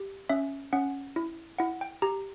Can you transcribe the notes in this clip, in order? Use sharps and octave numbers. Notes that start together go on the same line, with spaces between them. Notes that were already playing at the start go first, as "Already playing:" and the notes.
Already playing: G4
C#4 E5
C#4 F#5
E4
E4 F#5
G5
G4 A#5